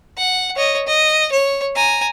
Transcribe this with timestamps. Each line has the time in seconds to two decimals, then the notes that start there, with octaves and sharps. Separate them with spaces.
0.18 F#5
0.56 C#5 D#5
0.87 D#5
1.32 C#5
1.75 G#5 A#5